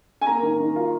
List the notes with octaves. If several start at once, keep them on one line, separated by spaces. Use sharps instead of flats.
G#5
A#3 A#5
D#3
D#3
F4